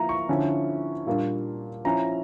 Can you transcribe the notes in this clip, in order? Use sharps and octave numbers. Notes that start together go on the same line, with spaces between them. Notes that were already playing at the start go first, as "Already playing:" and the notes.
Already playing: F3 A#3 E4 A#5
C#6
D3 F3 C#4 E4
A#2 G3 A#3 D4
F3 C#4 E4 A#5